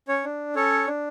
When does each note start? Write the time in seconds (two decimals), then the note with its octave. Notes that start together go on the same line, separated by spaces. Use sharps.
0.08 C#4 C#5
0.24 D4
0.55 C#4 A4 C#5
0.87 D4